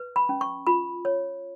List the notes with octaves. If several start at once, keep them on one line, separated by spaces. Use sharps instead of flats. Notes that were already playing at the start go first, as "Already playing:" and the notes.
Already playing: B4
B5
C#4
C#6
F4 B5
C#5